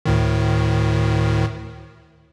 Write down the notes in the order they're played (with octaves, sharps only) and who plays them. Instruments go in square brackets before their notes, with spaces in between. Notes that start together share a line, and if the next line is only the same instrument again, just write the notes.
[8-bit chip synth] D2 A2 D#3